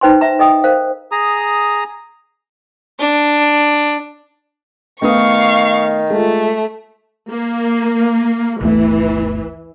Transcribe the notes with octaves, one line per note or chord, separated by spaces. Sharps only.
D#4 B4 C5 G5 G#5 C6
E5 A#5
A4 D#5 G5 D#6
A#4 C5 F5
G#4 A#5 D#6
D4
D#3 A3 B3 F5 C#6 D#6
G#3 A3 F4
A#3
G1 D2 E3 A3